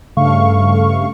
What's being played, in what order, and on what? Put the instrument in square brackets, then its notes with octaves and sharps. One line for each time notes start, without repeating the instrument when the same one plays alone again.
[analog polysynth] G2 C#3 A3 F5 C#6